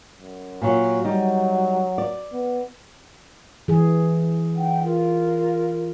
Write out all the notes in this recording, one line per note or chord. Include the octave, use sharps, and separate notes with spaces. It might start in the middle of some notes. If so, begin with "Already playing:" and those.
F#2
A#2 F#3
F#3 G3 D#4
D5
B3
E3 G#4
D#4 F#5 G5
F4 A#4